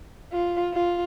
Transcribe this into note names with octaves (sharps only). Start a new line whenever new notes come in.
F4
F4